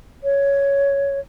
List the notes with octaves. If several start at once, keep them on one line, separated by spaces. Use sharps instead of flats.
C#5